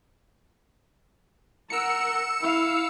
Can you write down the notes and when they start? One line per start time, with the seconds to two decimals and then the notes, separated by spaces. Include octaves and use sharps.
1.70 A#4 F#5 E6 C#7
2.40 E4 F5